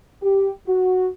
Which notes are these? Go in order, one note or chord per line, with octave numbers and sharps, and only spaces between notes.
G4
F#4